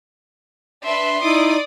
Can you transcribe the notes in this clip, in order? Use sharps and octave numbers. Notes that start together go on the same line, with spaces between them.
D4 B4 E5 C6
D#4 E4 D5 D6 D#6